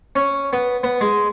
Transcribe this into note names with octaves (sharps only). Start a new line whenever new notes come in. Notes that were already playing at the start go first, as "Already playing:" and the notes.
C#4
B3
B3
G#3